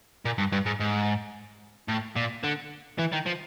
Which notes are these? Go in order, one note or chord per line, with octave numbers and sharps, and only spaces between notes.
A#2
G2
G2
G#2
G#2
A2
A#2
D3
E3
D#3
F3